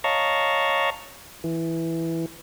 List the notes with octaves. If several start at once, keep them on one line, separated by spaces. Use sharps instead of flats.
C#5 D#5 F5 A5 A#5 C#6
E3